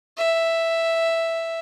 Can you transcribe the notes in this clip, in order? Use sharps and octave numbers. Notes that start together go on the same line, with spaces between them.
E5